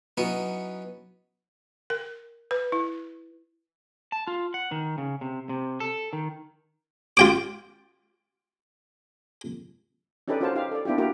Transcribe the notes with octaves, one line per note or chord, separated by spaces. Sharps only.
F#3 B3 C#4 D#4 E4
A#4
B4
E4
A5
F4
F#5
D#3
C#3
C3
C3
A4
D#3
F4 G5 D6
C#4 D#4 G4 A4 B4 D5
C#4 F4 F#4 A#4 C5 A5
D#4 G4 F5
A4 D5
B3 D4 E4 F4 G4
A#3 E4 F#4 G4 A#4